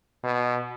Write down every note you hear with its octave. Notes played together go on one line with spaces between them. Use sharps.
B2